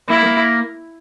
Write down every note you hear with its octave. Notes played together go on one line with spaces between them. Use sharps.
A#3 E4
A#3